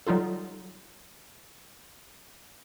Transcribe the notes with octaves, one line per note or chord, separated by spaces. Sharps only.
F#3 G3 D#4 F4 A4